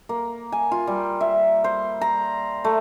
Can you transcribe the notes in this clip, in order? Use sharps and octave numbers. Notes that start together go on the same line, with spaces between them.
A#3
G#5
F4
G3
E5
C5
A#5
A3